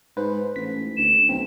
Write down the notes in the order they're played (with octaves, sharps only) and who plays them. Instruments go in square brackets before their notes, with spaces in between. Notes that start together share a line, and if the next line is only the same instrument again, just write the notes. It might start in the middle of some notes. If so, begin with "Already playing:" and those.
[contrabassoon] G#2 [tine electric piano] B4 C5
[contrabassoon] A1 [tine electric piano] B6
[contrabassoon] D2 [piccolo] E7
[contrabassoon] B1 [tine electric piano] C4